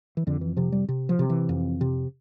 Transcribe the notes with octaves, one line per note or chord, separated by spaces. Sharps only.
E3
F2 D3
E3
C3 F3
G3
C3
F3
C3
E3
F2
C3